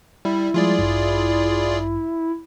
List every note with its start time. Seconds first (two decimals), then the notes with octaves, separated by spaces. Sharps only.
0.25 G3 E4
0.54 F3 G3 G#3 F4 G#4 D5
0.79 A1 G2